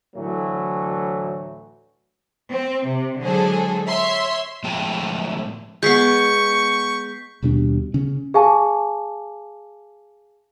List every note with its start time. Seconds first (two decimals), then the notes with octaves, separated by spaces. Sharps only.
0.16 D2 A2 E3 F#3 A3
2.51 C4
2.89 C3
3.22 D3 F#3 G#3 G#4 A4 C5
3.88 C#5 E5 C6
4.64 A2 F3 G#3 G5 A5
5.83 G#3 B3 C#6 G6 B6 C7
7.42 D#2 B2 G3 D4
7.94 C#3 C#4
8.34 G#4 F5 G#5 A5 D6